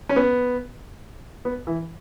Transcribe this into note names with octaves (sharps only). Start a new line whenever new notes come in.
C#4
B3
B3
E3